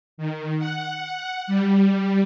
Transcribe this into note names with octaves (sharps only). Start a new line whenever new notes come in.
D#3
F#5
G3